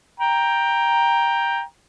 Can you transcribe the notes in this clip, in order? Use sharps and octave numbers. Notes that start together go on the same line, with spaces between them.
G5 A#5